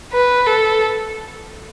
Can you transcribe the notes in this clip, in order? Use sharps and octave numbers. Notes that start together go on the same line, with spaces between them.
B4
A4